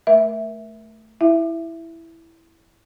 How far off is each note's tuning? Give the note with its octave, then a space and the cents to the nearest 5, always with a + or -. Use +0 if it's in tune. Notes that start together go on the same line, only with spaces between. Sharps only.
A3 +0 A#4 +30 E5 +0
E4 +0 E5 +15